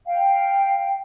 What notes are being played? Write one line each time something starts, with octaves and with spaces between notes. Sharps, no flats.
F5 G5